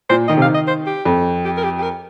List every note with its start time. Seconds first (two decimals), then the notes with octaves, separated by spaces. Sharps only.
0.10 A#2 C5
0.28 D#3 D#5
0.37 C3
0.42 F5
0.45 D#3
0.54 D#5
0.67 C5
0.86 G4
1.05 F2
1.45 G4
1.57 A#4
1.64 G4
1.78 G4
1.82 A#4